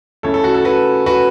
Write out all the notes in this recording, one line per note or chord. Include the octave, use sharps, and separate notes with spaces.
C#3 A3 C#4 E4 A4 C#5
A4
F#4
A4
F#4 B4
F#4 B4